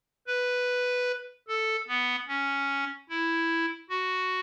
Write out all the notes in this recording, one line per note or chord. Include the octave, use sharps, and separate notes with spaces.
B4
A4
B3
C#4
E4
F#4